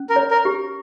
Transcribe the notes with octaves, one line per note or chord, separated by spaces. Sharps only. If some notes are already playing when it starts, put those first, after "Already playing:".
Already playing: C#4
A#4
C#5
A#4
G4